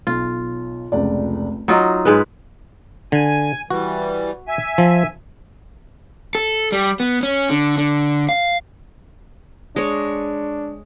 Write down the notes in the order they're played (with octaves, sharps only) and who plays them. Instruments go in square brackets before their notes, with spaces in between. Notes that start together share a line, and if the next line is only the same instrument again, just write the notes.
[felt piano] B1 [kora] F4
[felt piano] F1 C#2 D5
[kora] F#3 D#4 F4 [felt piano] F#4 D#5
[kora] G#2 G#3 B4
[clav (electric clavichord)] D3 [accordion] G#5
[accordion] E3 G3 [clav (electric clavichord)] F#4
[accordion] E5 G#5
[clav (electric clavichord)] F3
[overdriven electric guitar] A4
G3
B3
C#4
D3
D3
F5
[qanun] G#3 C#5 [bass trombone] D4